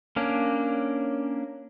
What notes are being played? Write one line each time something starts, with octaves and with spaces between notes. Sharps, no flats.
A#3 C#4 D4